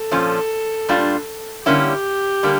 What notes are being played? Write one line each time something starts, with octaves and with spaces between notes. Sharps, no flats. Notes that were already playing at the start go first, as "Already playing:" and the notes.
Already playing: A4
A#2 F3 C#4
A#2 G3 D4 F4
D3 G3 A#3 C#4 E4 G4
D3 G3 A#3